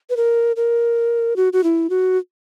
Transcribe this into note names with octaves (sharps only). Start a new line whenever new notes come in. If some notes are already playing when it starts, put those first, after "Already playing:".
B4
A#4
A#4
F#4
F#4
E4
F#4